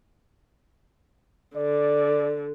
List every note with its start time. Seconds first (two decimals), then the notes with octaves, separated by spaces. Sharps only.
1.56 D3 D5